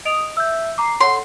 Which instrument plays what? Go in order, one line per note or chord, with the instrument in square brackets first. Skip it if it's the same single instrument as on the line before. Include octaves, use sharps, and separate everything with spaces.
[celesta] D#5 D7 F7 [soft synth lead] D#6
[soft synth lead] E5 [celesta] E6 G6
[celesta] A#5 D6 [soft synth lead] C7
[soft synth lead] A4 [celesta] C#5 F#5 [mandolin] C6